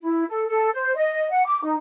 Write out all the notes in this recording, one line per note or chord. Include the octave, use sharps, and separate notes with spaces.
E4
A4
A4
C5
D#5
F#5
D6
D#4